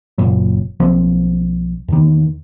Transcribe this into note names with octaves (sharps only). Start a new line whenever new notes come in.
F#1 A#2 F#3
B1 F3 C4
E2 D#3